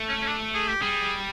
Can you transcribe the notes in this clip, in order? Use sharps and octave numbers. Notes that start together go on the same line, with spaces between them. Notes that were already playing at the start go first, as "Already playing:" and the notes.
Already playing: A3
C#4
C#4
D4
G#4
G4
G3 G#4